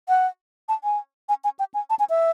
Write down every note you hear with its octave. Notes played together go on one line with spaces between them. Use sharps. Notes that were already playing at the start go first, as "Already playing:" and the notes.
F#5
A5
G#5
G#5
G#5
G5
G#5
A5
G#5
E5